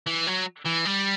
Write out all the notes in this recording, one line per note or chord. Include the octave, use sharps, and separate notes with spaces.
E3
F#3
E3
G3